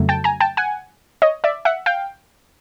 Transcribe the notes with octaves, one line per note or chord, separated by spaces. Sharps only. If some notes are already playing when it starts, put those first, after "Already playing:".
Already playing: F2 C#3 F#3 A3
G5 A5
G#5 A#5
G5 A5
F#5 G#5
C#5 D#5
D5 E5
E5 F#5
F5 G5